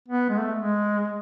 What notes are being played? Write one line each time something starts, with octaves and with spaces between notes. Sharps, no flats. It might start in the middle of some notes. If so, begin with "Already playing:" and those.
B3
G#3
A3
G#3